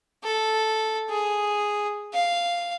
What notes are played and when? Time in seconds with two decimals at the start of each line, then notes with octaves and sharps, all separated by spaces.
0.24 A4
1.10 G#4
2.13 F5